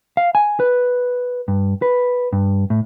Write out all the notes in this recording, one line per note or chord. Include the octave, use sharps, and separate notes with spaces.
F5
G#5
B4
G2
B4
G2
A2